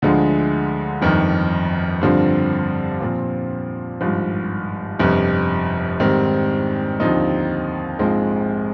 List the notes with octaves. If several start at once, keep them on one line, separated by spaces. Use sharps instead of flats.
D2 D3 F3 G#3
G1 F2 D#3
G2 D3 F3 C4
A#2 F3 C4
G#1 G2 F3
G1 F2 C3
G#2 D#3 G3 C4
D#2 D3 F3 C4 D#4
A#1 G#2 F3 G#3 C4